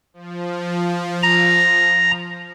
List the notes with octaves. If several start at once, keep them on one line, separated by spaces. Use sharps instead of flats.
F3
A#5